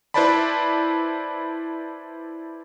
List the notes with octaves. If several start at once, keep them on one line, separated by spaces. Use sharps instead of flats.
E4 B4 C5 D5 A5 B5